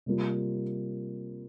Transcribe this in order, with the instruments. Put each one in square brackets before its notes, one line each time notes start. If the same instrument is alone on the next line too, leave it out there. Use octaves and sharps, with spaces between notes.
[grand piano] C3 G3 A#3 F4